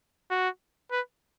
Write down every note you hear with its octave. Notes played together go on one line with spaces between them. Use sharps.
F#4
B4